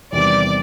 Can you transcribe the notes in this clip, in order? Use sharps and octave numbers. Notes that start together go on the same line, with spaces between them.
E2 C3 D#3 G3 D5